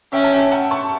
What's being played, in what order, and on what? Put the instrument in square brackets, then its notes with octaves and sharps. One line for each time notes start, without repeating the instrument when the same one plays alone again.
[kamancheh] C#4 [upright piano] E5 G5
[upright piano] A5
E5 G5
F#5 A5
A5 C#6